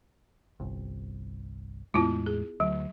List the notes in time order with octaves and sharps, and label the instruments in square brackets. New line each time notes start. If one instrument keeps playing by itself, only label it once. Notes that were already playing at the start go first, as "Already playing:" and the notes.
[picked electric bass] G1 C2
[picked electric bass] E2 A2 G#3 [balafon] B3 E4 F4
[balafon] G#4
[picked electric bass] D2 [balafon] F#3